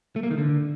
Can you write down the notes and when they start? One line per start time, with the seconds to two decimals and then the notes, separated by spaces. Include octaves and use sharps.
0.16 A3
0.23 A#3
0.31 D#3
0.38 D3